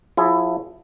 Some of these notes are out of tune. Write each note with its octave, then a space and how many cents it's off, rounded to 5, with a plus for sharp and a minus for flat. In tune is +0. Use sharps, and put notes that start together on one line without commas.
F3 +35 E4 +15 G#4 +0